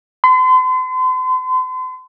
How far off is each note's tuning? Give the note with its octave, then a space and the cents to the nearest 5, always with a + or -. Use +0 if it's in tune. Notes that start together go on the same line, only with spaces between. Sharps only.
C6 -40